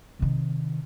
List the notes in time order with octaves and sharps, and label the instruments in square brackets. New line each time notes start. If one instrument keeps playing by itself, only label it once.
[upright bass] C3 D#3